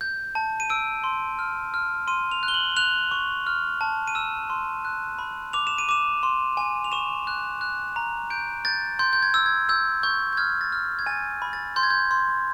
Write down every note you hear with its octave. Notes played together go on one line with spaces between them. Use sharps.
G6
A5
D#7
E6 D7
C6
F6
F6
C6 D#7
F7
F#6
G7
F#7
F#6 F7
C#6
F6
A5
D#7
E6 E7
C6
F#6
B5
D6 F7
E7
D#7
D6 E7
C6
G#5
F7
C#6 E7
F#6
F#6
A#5
G6 D7
G6 A6
C6 G6
G6
G#6
E6
G#6
E6 G6
C#6 G6
G6
F6 G#6
A6
F6
G#6
G#5 A6
B5
A6
C6 G6
G#6
G6
C6